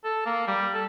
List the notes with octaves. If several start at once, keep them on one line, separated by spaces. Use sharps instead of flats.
A4
A#3
G3
A4